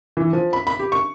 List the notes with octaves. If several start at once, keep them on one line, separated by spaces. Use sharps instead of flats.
E3
F3
B5
B5
G4
C#6